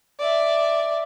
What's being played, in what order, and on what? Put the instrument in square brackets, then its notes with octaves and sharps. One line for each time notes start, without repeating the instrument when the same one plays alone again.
[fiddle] D5 E5